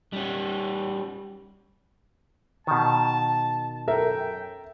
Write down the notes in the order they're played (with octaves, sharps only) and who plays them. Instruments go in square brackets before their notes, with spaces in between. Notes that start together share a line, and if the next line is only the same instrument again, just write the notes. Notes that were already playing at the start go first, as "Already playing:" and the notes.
[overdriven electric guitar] G3 C#4
[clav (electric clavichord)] B2 D#3 [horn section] A5
[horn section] F#2 G5 [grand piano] A4 A#4 E5